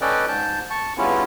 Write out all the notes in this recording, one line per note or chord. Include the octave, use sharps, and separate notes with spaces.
C#4 A4 B4 D5 D#5 G5
G#2 A5 G6
A5 C#6
G2 C#3 B3 C#4 E4 F4